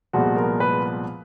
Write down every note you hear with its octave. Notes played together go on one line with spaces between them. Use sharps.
C2 A#2 F3 G#3 B3 F#4
A#4
B4